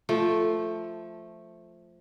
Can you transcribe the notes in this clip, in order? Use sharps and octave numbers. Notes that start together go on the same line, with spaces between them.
F3 A3